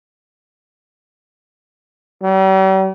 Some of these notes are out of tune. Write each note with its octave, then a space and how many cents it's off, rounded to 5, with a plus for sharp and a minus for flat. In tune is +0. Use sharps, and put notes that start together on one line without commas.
G3 -45